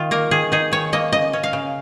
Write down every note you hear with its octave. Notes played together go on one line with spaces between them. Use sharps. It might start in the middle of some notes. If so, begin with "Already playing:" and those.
Already playing: D#3 F4
A#3 A#4
D#3 G#4
D#4 G#4
D#3 C#5
A#3 D#5
C#3 D#5
C#4
F5
C#3